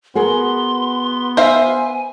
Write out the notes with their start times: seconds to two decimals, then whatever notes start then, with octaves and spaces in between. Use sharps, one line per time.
0.15 B3 F#4 G#4 A#4 C6
1.37 C5 E5 F5 G#5